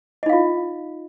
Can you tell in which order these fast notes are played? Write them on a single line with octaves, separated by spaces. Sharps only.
D#5 D#4 F5 F4